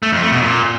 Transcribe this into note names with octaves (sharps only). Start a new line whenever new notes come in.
A3
F2
A3
B2
A#2